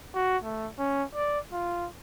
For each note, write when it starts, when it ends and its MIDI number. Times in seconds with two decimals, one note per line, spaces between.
0.15 0.37 66
0.43 0.68 57
0.78 1.03 61
1.15 1.39 74
1.52 1.86 65